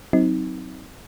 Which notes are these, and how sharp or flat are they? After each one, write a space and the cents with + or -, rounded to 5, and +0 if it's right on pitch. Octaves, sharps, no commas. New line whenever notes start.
F#3 +0 C4 -5 D#4 +25